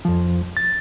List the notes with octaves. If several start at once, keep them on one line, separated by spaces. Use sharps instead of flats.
F2 F3
A6